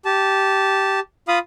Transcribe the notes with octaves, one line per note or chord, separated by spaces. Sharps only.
G4 A5
F4 F5 B5 D#6